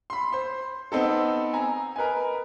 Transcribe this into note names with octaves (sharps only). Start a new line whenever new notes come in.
B5 C6
C5 C6
B3 C4 D#4 A4
G#5 A#5
A#4 B4 D#5 G#5